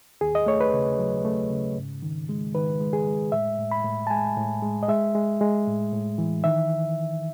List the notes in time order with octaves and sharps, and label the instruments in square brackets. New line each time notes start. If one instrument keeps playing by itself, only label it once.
[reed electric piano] D#2 G#4
D#5
A3 C#5
B4
C#3
F#3
A3
C#3
G#2
D#3
G#3
D#3 B4
G#3
G#4
G#3
A2 E5
A2
B5
A2
A5
G#3 G#5
A2
G#3
D#5
G#3 E5
G#3
G#3
A2
A2
E3
D#3 E5